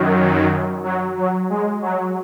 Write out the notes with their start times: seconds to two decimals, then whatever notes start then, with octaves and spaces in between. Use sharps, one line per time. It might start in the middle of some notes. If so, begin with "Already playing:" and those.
Already playing: F#2 D#3 F#3
0.84 F#3
1.17 F#3
1.50 G#3
1.82 F#3